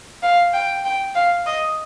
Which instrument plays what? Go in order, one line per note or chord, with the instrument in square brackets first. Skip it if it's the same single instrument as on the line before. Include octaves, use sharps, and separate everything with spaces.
[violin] F5
G5
G5
F5
D#5